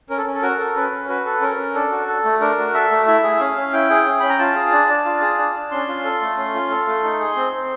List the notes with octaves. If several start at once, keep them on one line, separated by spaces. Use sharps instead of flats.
C#4 A#4
A4
C#4
A4
F#4 A#4
A4
C#4 B4
C#4
F#4 B4
A4
C#4 A#4
C#4
D4 A4
F#4
A4
A3
D4 A#4
F#4
A4 E5
A3
E4 E5
G#4
C#4 F5
C#4
E4 G5
G#4
C#4
C#4 B5
A#5
F4 A5
G#4
D4
D4
F4
G#4
D4
D4
C#4 C6
F4
A4
A3
C#4
F4
A4
A3
D#4
G#4
C4
C4